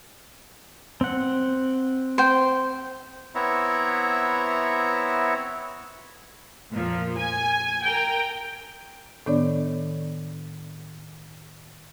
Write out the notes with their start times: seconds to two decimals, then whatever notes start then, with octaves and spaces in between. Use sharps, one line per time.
1.01 C4 F#5
2.18 C5 G5
3.35 B3 C4 E4 C#5 E5 A#5
6.72 F2 A#2 F3
7.17 G#5
7.82 A#4 G5
9.26 A2 D#3 B3 D4 C#5 D5